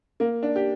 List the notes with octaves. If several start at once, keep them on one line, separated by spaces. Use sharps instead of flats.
A#3
D4
G4